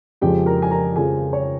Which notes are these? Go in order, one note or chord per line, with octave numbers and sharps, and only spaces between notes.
F2 C#3 F3 G#3 G4 G5
A#4 A#5
G#5
A#4 A#5
F2 C#3 F3 G#3 G#4 G#5
C#5